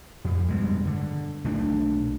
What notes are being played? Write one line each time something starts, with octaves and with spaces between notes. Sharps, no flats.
F2
G2 B2 G#3
D3
B1 A3 C#4 D4